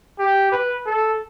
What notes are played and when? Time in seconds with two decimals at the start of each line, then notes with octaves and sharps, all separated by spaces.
0.19 G4
0.52 B4
0.86 A4